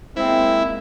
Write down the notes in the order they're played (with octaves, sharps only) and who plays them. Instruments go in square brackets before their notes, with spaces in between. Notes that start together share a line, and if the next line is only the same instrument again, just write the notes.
[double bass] G#3 A#3 [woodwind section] C4 [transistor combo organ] E4